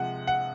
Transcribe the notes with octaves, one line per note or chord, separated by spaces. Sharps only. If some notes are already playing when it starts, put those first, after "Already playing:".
Already playing: C3 F3 G#3 F#5
F#5